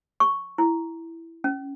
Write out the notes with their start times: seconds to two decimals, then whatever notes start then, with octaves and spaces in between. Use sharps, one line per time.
0.20 C#6
0.58 E4
1.44 C#4